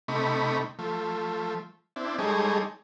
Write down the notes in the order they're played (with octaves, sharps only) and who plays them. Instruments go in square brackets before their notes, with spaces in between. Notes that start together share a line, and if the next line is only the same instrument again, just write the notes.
[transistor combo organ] C3 A3 D#4 B5 C#6
F3 A3
C4 D4 E4
G3 G#3 D#4 G#4 A4 C#5